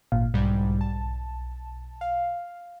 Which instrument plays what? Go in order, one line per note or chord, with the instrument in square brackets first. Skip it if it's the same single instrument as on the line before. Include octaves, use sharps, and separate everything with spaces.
[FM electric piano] G#1 A#2 F5
[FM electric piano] B1 [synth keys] G#2 G3
[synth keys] A5
F5